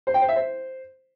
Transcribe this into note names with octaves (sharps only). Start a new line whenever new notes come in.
C5
G5
C5
E5
C5